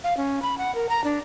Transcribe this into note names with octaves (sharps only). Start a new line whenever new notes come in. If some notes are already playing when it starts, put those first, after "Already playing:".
F5
C#4
B5
F#5
A#4
A#5
D4